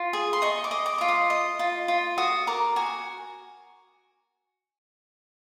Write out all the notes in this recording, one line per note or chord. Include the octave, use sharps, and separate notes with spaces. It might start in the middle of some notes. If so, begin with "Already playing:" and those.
Already playing: F4
G#4
C6
D#5 C#6
D6
D#5
D6
F4 D6
D#6
D#5
F4
F4
F#4 D#6
A#4 D6
F#4 G#5